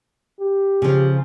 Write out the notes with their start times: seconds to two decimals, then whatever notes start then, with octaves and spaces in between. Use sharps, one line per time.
0.40 G4
0.82 C#3 F3